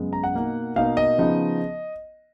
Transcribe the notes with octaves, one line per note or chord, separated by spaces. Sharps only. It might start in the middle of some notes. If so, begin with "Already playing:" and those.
Already playing: F#2 C#3 G#3 B3
A#5
F#5
B2 A#3 D#4
B2 A#3 D#4 F5
D#5
C#3 F3 B3 D#4